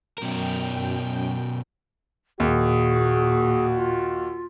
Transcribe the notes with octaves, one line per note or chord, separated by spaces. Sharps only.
F#2 B2 A#4 G5
D#2 A#2 F#4 G#4
F4